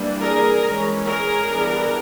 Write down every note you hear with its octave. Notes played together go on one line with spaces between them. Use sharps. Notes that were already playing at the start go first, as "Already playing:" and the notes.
Already playing: E3 G3 A#3 D4
G#4 A#4
E3 G#3 C#4
G#4 A#4
E3 G3 B3 D4